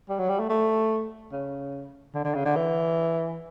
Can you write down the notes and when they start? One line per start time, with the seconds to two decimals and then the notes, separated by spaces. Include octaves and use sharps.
0.09 G3
0.19 F#3
0.29 G3
0.40 A3
0.50 A3
1.32 C#3
2.14 D3
2.25 D3
2.35 C#3
2.45 D3
2.56 E3